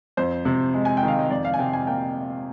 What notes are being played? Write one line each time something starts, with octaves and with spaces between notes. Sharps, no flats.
F2 C5
C3
G#3
G#5
G5
D#3
F5
D#5
F2 D5
F5
G#5
C3 G5
G#5
A#3 G5